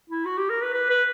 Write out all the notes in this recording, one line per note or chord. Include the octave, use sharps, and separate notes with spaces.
E4
F#4
G4
A#4
B4
B4
B4